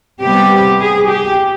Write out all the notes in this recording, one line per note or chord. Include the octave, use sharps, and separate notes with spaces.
C3 G3 B3 G4
G#4
G4